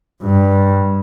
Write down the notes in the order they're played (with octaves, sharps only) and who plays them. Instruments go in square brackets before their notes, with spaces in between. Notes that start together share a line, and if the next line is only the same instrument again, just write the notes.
[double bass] G2